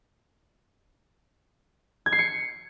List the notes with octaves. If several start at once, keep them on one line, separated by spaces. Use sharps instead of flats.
G#6
C7
C#7